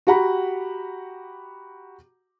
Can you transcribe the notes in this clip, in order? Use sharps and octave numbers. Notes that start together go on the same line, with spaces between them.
F#4 G4 F#5 A#5 B5